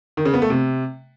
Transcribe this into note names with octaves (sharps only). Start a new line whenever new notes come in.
D#3
C#3
B3
A3
C3